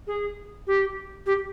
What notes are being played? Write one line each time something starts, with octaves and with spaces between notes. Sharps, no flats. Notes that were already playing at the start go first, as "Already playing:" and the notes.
G#4
G4
G4